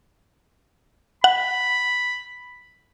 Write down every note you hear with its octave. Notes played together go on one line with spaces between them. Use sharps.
F#5 B5